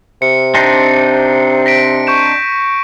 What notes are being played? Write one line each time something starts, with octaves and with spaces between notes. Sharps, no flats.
C3 C#7
C4 D4 D#4
A#6 B6 D7
C#6 G6 E7